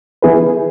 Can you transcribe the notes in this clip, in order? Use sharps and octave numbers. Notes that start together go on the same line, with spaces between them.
E3 B3 E4 G#4 B4